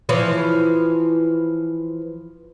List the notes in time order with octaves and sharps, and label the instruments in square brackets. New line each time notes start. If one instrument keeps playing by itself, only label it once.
[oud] E3 F3 C#5